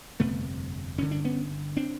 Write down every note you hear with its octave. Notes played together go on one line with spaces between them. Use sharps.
G1 F2 C3 A3 B3
G1 F#2 D3 C#4
D4
B3 C#4
C4 D4